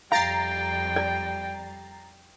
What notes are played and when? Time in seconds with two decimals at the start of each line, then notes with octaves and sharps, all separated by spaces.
0.12 F2 G3 F5 G5 A#5 A6 C7
0.96 D5